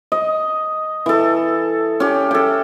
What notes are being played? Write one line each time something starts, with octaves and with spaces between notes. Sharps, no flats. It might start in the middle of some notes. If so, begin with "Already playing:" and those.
D#5
E3 A4
C#4 G4
A4 G5